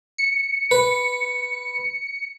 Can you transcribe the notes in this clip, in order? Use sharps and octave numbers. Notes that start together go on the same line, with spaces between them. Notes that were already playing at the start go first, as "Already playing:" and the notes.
C#7
B4